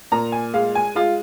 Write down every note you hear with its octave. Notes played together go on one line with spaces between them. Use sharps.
A#2 A#5
G#5
G#3 F5
G#5
G#3 F4